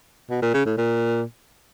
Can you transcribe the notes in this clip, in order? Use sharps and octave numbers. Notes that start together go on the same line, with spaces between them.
B2
A#2
C#3
A2
A#2